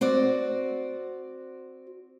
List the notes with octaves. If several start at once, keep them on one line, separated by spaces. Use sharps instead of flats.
C4 F#4 D5